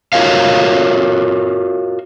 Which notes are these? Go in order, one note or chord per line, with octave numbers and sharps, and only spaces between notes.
F4 F#4 A#4 C#5 D#5 F5